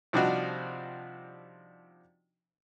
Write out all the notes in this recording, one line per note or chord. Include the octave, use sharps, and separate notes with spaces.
C3 F3 G3 D4 D#4 F#4